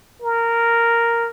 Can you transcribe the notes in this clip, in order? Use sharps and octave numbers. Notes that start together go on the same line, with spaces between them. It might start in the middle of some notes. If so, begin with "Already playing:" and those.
A#4